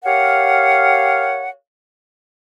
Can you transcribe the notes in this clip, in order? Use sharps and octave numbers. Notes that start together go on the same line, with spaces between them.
G4 A#4 C#5 F5 F#5